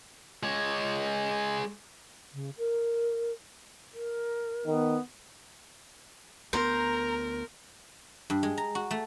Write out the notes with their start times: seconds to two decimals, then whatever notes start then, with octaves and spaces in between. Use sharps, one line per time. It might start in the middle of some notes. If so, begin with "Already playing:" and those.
0.43 G#3 C#5
2.33 C#3
2.58 A#4
3.93 A#4
4.66 D#3 B3
6.53 D2 B3 A#4 C5 A#5
8.30 G2
8.43 G#3
8.58 A#5
8.75 F#4
8.91 A3